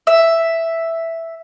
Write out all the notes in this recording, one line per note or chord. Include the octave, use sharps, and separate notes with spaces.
E5